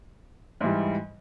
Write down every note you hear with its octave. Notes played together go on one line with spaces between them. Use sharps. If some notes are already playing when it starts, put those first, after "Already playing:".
G#2 E3 G3